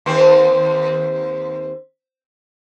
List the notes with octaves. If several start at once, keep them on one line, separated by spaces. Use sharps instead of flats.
D#2 C4